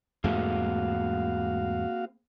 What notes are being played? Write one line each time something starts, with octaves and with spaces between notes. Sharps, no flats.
E2 G#2 A3 A#3 C4 F#4 G#4 F5